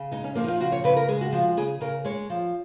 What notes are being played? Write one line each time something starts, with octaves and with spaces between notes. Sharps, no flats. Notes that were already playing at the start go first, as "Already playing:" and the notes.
Already playing: C#3
G#3 D#4
C#4
F3 A#3
D#4
F4
C#3 F#4
C#5
C#3 B4
A#4
G#3 G#4
F#4
F3 F#4
C#3 G#4
C#3 A#4
G#3 C#5
F3